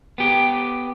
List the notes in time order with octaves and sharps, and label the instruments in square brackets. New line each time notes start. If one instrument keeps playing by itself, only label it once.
[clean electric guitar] B3 G4